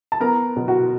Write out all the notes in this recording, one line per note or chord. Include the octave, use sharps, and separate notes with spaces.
A5
B3 A#4 A#5
B2
F#4 F#5